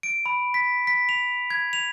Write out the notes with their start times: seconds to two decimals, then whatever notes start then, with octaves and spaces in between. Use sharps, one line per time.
0.03 D7
0.26 B5
0.54 B6
0.87 B6
1.09 F7
1.50 G#6
1.73 F7